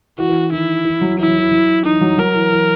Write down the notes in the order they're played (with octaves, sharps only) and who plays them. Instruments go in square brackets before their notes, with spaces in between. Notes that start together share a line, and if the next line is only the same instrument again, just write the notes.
[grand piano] E3 [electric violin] F#4
[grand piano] E3
[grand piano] D#3 [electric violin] E4
[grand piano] E3
F#3
[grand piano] E3 [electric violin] E4
[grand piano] F#3
E3
F#3
[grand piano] E3 [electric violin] D#4
[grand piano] F#3
[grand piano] F#3 [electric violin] A#4
[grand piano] E3
E3